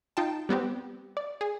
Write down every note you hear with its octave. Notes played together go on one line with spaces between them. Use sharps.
D#4 F4 G5 A5
G3 B3 C4 G4
D5
G#4